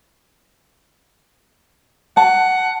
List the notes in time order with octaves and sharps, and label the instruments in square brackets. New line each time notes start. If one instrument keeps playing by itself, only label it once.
[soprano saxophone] F#5 [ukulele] A5